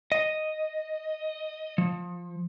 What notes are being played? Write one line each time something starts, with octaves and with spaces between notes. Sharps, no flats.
D#5
F3